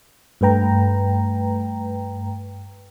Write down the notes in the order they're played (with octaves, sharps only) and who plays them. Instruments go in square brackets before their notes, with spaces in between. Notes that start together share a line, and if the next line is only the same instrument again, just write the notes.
[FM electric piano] G2 A3 B4 G5 A#5